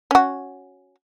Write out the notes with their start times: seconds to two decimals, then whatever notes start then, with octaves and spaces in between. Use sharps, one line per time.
0.11 C#4 F#4